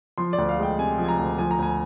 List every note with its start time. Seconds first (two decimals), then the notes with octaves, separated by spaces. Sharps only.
0.18 F3 C6
0.33 D5
0.38 D2
0.49 F5
0.59 G#3 G5
0.79 C3 G#5
0.98 F3
1.04 G#5
1.08 A#5
1.19 D2
1.38 F3 G#5
1.51 A#5
1.59 D2 G#5